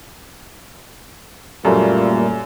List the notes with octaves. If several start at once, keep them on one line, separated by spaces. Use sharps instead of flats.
F#2 A#2 G3 A3 A#3